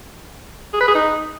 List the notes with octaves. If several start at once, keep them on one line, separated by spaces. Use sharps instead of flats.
G#4
B4
G#4
D#4